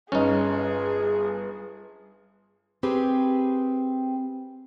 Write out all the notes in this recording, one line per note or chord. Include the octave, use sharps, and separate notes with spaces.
G1 C#4 D#4 G#4
C4 G4 G#4 B4